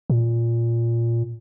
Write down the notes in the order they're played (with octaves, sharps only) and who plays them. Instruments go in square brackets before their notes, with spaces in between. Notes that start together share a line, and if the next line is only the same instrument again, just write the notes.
[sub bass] A#2